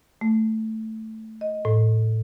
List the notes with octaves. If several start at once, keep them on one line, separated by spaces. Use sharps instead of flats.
A3
D#5
A2